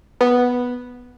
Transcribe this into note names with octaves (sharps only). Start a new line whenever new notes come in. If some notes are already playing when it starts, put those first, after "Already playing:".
B3